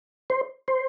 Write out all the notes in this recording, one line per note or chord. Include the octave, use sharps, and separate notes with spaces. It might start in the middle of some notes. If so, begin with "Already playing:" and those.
C5
C5